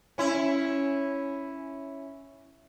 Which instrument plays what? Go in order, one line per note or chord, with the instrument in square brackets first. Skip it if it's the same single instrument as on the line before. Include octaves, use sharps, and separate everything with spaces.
[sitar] C#4 E4